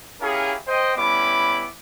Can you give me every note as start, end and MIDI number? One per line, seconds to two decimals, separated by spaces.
0.22 0.55 61
0.22 0.55 64
0.22 0.55 67
0.22 0.55 68
0.22 0.55 70
0.22 0.55 77
0.68 0.93 72
0.68 0.93 75
0.68 0.93 79
0.97 1.67 55
0.97 1.67 59
0.97 1.67 61
0.97 1.67 64
0.97 1.67 83
0.97 1.67 86